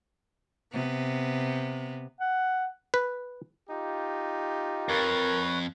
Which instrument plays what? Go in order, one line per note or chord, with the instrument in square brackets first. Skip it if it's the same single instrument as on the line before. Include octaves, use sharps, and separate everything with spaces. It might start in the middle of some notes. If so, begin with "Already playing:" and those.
[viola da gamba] C3 B3
[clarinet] F#5
[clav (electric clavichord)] B4
[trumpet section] D#4 F4 G4
[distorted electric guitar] F2 [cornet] A#4 [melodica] B4 C#5